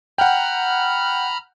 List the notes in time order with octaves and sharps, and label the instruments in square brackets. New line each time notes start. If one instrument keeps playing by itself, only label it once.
[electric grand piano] F#5 G5 [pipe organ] A#5 B5 F6